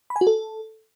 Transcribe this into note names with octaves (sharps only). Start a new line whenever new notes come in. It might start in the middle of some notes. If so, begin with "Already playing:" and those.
B5
G#5
F#4
A4